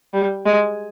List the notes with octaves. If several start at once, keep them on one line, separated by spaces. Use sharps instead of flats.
G3
G#3